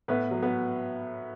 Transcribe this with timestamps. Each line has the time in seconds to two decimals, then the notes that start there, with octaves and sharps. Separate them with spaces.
0.08 A2 B3 B4
0.31 F#3
0.43 B3 B4